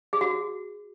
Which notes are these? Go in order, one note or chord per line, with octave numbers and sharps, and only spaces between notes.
G#4
F#4